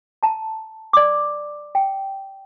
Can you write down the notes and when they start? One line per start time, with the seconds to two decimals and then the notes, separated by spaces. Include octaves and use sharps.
0.23 A5 A#5
0.93 D5 D6
1.75 G5